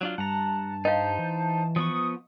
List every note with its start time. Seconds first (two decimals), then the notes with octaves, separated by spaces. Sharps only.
0.01 F#3 D4 F4
0.18 G2 F#5 A5 A#5
0.85 D#4 C5 D#5 F5
1.19 E3
1.76 F3 B3 C#6 D#6